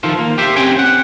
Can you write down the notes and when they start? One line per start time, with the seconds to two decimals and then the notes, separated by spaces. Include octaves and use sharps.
0.03 D#3 F3 F4 A4
0.19 A#3
0.38 G4 C5 E5
0.56 C4 C#4 G4 C5 G5 G#5
0.79 F#5